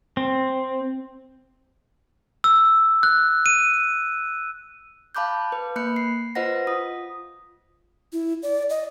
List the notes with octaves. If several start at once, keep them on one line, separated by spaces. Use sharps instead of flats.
C4
E6
F#6
D#7
F5 A5 B5 D6 F#6 G6
B4
A#3 B5 F#6 C#7
C7
F4 B4 C5 D#5 F#5 A#6
F4 D#6
E4
D5
D#5